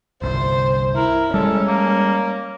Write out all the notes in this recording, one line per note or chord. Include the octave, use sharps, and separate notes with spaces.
G1 C2 C5
E4 A#4
G3 G#3 C#4 A4
A#3